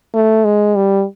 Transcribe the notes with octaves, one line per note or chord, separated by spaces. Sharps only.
A3
G#3
G3